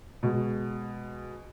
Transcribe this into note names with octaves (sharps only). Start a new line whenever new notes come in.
B2 G#3